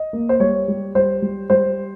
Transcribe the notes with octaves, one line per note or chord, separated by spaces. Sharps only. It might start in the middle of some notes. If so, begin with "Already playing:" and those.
Already playing: D#5
A#3
C5
G3 C#5
G3
G3 C5
G3
G3 C5